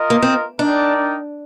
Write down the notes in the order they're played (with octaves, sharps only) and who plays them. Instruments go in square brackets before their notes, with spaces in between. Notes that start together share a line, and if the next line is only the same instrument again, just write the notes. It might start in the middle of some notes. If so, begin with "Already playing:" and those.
Already playing: [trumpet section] F4 A#4 D#5
[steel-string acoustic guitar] A#3
C4
[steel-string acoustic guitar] D4 [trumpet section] D#4 A#4 D5 G5